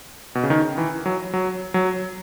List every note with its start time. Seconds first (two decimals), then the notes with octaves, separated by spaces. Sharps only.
0.35 B2
0.43 C#3
0.50 D#3
0.78 E3
1.06 F#3
1.33 F#3
1.74 F#3